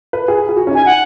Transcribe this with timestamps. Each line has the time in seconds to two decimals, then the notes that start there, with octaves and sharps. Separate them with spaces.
0.13 B4
0.28 G#4
0.49 G#4
0.56 F#4
0.67 C#4
0.71 D#4 G#5
0.86 F#5